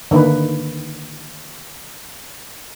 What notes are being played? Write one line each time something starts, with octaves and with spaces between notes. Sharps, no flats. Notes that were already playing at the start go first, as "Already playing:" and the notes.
D3 D#3 A#3 D#4 B4